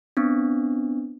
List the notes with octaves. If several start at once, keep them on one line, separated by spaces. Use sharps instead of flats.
B3 C4 D4